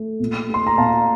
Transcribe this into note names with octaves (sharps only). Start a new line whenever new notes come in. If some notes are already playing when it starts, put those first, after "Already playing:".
Already playing: A3
A#2
A3
C6
A#5
A#2 F5 A5